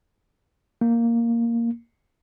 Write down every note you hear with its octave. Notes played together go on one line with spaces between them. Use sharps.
A#3